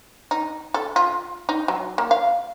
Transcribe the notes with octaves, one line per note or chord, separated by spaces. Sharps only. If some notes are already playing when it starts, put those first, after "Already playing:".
D#4
A4
F4
D#4
F#3
A#3
F5